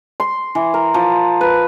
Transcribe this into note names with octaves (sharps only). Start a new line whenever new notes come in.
C6
E3
A#4
F3
B4